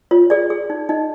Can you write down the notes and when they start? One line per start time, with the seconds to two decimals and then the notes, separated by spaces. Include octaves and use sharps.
0.11 F4 C#5
0.30 G#4 D5
0.50 G#4
0.70 D#4
0.89 D#4 D#5